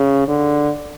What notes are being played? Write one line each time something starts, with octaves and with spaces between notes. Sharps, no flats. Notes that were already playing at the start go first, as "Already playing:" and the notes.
Already playing: C#3
D3